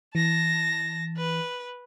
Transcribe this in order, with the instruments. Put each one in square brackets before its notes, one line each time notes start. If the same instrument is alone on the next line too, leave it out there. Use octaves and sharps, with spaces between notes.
[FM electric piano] E3 [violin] A5 A#6
[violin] B4